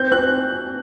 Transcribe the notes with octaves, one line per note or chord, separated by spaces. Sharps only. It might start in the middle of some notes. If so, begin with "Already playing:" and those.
Already playing: C4 G6
C4 F#6